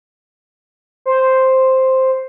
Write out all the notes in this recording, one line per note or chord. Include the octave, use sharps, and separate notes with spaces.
C5